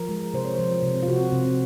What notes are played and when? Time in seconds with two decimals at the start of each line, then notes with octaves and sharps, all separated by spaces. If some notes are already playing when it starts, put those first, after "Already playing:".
Already playing: F3 A#4
0.09 G#3
0.34 C3 C5
0.45 C#5
0.54 F3 C5
0.83 C3
1.03 F4
1.08 C3 F#4
1.33 C3